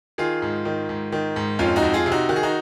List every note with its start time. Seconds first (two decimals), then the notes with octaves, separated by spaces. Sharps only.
0.18 D#3 F4 G#4
0.42 G#2
0.65 D#3
0.89 G#2
1.12 D#3
1.36 G#2
1.59 F2 C#4 F4
1.76 D#4 F#4
1.82 F2
1.93 F4 G#4
2.06 C3
2.12 D#4 F#4
2.29 D#3 F#4
2.36 G#4
2.43 D#4 F#4